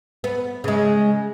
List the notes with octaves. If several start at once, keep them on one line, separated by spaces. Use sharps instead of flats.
B3
C#3 G#3